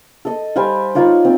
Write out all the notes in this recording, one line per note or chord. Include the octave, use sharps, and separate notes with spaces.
A4 D#5
G3 C5 F5 G#5
D#4 F4 C#5 D5
C4